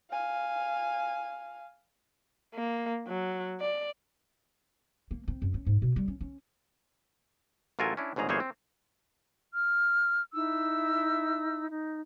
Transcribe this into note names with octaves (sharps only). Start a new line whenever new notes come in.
F5 G#5
A#3
F#3
D5
A#3
C4
F#2
C#4
G#2
B2
G3
C#4
C#4
A1 F#3 F4 A4 A#4 G#5
C#4 D4 E4
G1 G#2 C#3 G#4 A#5
G1 E3 A#3 G#4 C5 C#5
C4
F6
D#4 E4 E6
D#4